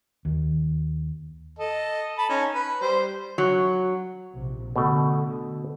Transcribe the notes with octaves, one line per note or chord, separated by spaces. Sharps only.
D#2
A4 D#5
A5 B5
C#4 D#4
B4 B5
G3 C5
F#3
A#1 C3
B2 D3 A3